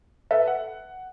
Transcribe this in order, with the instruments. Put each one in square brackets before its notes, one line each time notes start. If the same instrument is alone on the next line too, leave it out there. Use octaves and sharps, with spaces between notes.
[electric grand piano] A4 B4 [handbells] E5
[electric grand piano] F#5